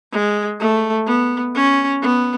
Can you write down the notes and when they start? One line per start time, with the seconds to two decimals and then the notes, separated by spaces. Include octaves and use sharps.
0.12 G#3
0.60 A3
1.06 B3
1.54 C#4
2.02 B3